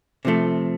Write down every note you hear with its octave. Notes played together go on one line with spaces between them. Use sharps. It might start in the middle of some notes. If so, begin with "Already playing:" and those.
C3 F3 A3